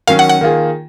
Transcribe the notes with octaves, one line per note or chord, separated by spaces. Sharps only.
D#3 F#3 C#4 F5
F#5
F#5
D#3 A#3 F4 G#4